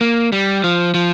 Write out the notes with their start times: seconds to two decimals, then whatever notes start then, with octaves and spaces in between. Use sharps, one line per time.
0.01 A#3
0.32 G3
0.64 F3
0.94 F3